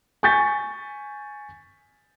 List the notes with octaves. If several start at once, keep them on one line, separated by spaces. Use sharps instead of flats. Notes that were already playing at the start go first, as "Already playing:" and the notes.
G#5 C#6 G6 A6 B6